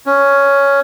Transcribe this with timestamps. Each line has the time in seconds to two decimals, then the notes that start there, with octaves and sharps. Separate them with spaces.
0.06 C#4